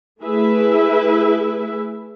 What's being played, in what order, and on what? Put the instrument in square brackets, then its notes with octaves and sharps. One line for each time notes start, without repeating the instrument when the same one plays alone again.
[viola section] A3 E4 G#4 B4 E5